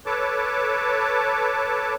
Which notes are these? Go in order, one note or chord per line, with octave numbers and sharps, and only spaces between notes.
A4 B4 C#5 A5 D6